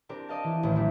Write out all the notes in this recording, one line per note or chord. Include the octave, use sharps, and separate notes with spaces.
C4 D4 G4 A#4
A#4 D5 D#5 F5 A5
E3
A1 D#2
F#3 A3 D4 E4